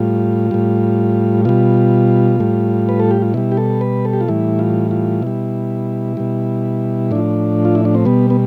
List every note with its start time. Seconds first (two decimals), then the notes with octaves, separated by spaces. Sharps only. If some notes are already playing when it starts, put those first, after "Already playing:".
Already playing: A2 G3 F4
0.51 A2 G3
1.45 B2 G3 F4
2.40 A2 G3
2.89 B4
3.00 A4
3.11 G4
3.22 F4
3.34 B2 G3 E4
3.52 G4
3.57 A4
3.81 B4
4.05 A4
4.13 G4
4.21 F4
4.28 A2 E3 G3 E4
4.59 F4
4.91 F4
5.22 B2 G3 E4
6.17 B2 G3
7.11 A2 F3 D4
7.65 F4
7.75 E4
7.85 D4
7.95 C4
8.05 B2 G3 B3
8.30 B3